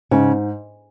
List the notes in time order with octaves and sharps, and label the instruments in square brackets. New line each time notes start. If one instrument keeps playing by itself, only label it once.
[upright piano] G#2 [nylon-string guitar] C#3